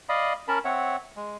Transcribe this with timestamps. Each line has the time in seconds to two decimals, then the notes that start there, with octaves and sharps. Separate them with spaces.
0.09 D5 D#5 F5 B5 D#6
0.48 C#4 A#4 A5 B5
0.65 C4 C#5 E5 F#5
1.16 G#3